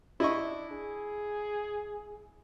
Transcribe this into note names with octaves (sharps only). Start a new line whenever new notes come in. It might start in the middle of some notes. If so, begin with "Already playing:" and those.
D4 E4 D#5 C#6
G#4